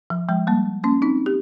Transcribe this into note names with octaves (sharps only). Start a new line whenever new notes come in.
F3
F3 G#3
G3 A#3
A#3 C#4
C4 D#4
G4